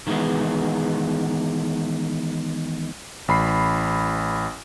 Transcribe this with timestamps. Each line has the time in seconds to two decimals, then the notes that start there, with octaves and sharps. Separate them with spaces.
0.07 D#3 E3 G#3 B3
3.28 A1 B5 C7